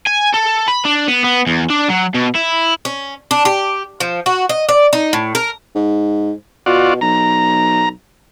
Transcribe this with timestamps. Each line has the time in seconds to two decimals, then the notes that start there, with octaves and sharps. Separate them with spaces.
0.06 G#5
0.34 A4
0.68 B5
0.85 D4
1.08 B3
1.24 B3
1.47 E2
1.70 D4
1.89 F#3
2.15 B2
2.35 E4
2.85 C#4
3.31 D4
3.45 G4
4.00 F3
4.26 F#4
4.49 D#5
4.69 D5
4.93 D#4
5.13 A2
5.35 A#4
5.75 G#2
6.66 B2 F4 F#4 D5
7.01 B1 A#5